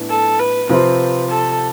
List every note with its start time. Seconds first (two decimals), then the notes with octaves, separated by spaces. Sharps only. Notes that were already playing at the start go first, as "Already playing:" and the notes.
Already playing: A2 E3 B3 D4
0.09 A4
0.39 B4
0.69 C3 F3 C4 F4 B4
1.30 A4